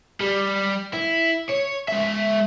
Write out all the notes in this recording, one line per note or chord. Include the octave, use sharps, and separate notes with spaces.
G3
E4
C#5
G#3 E5